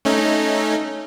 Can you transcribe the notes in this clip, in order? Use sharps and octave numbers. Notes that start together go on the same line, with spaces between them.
A3 C#4 D#4